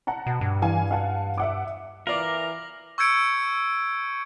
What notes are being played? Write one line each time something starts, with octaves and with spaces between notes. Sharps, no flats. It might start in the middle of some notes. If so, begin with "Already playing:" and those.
F#5 A5 A#5
B2
G2
E3 F5 G#5
F5 F#5 A5
E5 F#5 D6
E3 F4 A#4 D5 D6 A#6 F#7
C#6 E6 G6 G#6 C#7 D7